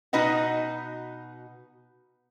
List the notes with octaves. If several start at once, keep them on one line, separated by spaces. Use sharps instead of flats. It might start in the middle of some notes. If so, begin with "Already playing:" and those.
B2 D#4 F#4 B4 D#5 F#5